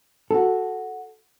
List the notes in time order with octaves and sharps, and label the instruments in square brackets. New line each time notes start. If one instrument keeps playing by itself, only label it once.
[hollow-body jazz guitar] F#4 A4